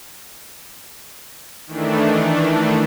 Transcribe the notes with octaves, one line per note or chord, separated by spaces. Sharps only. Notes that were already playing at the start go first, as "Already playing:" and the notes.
D#3 E3 A3 D4